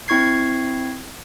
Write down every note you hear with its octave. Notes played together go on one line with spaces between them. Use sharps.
C4 E4 C#6 G#6 C7